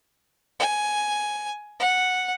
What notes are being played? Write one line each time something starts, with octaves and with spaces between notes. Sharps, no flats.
G#5
F#5